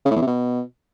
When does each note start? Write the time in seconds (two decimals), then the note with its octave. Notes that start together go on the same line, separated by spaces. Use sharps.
0.06 C#3
0.11 A2
0.16 E2
0.22 C3
0.27 B2